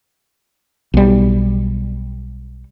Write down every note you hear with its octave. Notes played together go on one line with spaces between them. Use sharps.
B1 G3